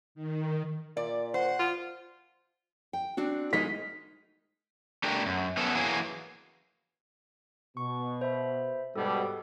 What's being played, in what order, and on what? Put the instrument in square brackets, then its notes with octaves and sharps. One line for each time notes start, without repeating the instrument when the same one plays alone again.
[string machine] D#3
[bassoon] A#2 [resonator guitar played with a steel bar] D5
[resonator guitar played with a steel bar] C5 [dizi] F#5
[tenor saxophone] F4
[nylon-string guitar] G5
C4 D4 F#4
[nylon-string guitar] G#3 D#4 A#4 [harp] B6
[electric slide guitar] A3 D4 G4 A#4
F#2
B3 C#4 A4
E3 F#3 A#3 G#4
[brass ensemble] B2 [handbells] C#6
[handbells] C5 E5 B5
[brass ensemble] G#2 B2 G3 [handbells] G4 A4